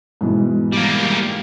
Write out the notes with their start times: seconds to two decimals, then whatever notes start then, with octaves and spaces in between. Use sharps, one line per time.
0.21 G#2 B2 E3
0.73 G3 A#3